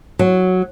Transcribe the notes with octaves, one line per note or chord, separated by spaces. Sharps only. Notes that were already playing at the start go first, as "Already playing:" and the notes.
F#3